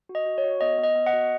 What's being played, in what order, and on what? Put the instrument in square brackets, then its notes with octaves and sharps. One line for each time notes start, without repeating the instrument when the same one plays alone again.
[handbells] F#4
D#5
F#4
C#5
F#4
B3 D#5
B3
D#5
B3
D#5 F#5
F#4